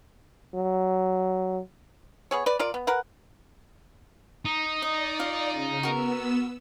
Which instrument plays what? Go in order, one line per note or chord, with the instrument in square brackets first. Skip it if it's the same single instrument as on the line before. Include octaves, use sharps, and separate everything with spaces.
[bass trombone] F#3
[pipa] B3 G#4 C#5
B4 D5
F4 A#4 D5
B3
A#4 B4 F#5
[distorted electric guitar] D#4
[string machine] D5 [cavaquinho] D#5
[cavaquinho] F4 F5
[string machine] C#3
[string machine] B3 E6 [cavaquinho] F#4 A#4